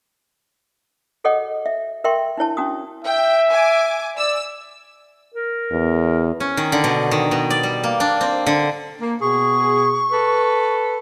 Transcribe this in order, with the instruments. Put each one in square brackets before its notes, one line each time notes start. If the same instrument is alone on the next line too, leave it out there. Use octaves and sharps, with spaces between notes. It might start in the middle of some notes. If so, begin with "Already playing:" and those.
[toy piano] F#4 G#4 A4 C#5 D#5 F#5
E5
A#4 E5 G5 C6 C#6
D4 E4 C#5 A5
C#4 D4 F#4 D#6
[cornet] E5 [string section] G5
[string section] G#5 D6
[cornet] D5 [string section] E6
[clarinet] A#4
[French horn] E2
[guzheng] C#4
D#3
D3
B2
D#3
B2
D5
G3
A#3
D4
C4
D3
[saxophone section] A#3
[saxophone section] B2 G#4 [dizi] C#6
[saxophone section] A4 B4